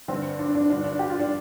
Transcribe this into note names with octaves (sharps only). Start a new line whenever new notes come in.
G2 D3 C4
D4
D4
G2 D3 D4
D4
G4
F4
D4